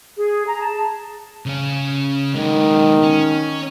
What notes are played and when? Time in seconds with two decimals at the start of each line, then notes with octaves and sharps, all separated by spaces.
0.17 G#4
0.46 A#5
0.61 A5
1.46 C#3 C#4
2.35 B1 D#3 G#3
3.02 C#4